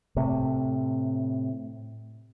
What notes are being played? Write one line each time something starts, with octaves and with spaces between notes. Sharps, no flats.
A2 C3